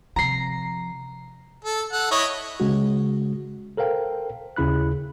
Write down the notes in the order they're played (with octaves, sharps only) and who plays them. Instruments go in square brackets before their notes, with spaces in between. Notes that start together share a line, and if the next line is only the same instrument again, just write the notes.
[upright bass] C3 F3 [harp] A#5 C7
[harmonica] A4
A4 F#5
E4 C#5 D#5
[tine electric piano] C#3 G#3 F#4
A4 A#4 C5 F5 G5
D#2 C#3 E4 B5 F#6